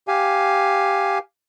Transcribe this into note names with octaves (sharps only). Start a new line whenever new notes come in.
G4 F5 G#5